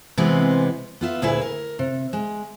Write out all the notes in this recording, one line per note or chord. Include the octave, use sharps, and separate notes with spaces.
C3 E3 G#3 B3 C4
B3 F4 E5
D2 A#2 E4 G#4 B4 E5
A#4
C3
G#3